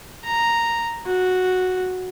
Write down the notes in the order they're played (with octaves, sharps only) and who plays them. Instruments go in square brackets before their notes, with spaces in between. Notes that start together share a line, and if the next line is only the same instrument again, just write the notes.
[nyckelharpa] A#5
F#4